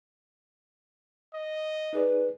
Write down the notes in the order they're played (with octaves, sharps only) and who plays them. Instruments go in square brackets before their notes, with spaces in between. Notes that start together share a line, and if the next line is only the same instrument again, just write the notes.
[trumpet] D#5
[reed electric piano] D#4 G#4 D5 [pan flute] B4